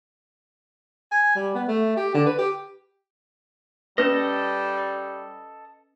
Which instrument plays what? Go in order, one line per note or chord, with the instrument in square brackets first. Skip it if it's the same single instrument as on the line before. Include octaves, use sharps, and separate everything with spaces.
[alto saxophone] G#5
G3
B3
A3
G4
D3
B4
G4
[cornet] G3 [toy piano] C#4 B4 [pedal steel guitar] A4 D#5